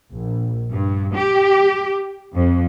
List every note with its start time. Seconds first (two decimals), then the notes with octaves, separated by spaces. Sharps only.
0.13 A#1
0.71 G2
1.16 G4
2.35 F2